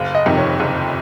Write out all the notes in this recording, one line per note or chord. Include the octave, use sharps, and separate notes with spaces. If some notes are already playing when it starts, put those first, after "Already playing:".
Already playing: F#1 F5
D#5
F2 C3 D#3
C#5
F#1